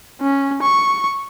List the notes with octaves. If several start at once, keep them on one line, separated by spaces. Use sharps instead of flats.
C#4
C#6